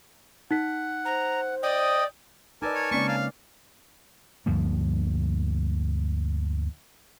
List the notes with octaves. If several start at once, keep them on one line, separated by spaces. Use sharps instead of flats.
D#4 F#5 B6
C5 A#5
D5 D#5 G5 D#6
D#4 A#4 B4 D5 G#5 A5 D6 E6
C#5
C#3 G#3 A#3 C4 C#4 D5 C#6
F5
D2 G2 F3 A#3